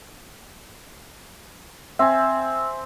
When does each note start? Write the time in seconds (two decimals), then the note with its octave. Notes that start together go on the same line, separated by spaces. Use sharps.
1.99 C4 E5 G#5